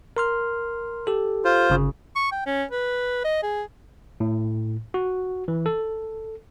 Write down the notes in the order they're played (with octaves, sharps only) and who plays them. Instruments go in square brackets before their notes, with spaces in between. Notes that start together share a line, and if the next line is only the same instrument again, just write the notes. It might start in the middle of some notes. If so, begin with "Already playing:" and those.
[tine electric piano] A#4 C6 F6
G4 A4
[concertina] F4 C5
[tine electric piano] G1 C#3
[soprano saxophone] C#6
G5
C#4
B4
D#5
G#4
[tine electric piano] A2
F#4
E3
A4